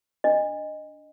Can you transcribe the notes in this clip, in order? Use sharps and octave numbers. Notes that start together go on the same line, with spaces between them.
D4 D#5